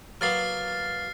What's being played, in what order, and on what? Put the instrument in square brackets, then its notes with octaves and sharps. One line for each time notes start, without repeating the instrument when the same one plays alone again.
[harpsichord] F#3 A#3 B3 [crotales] F6 A6 C7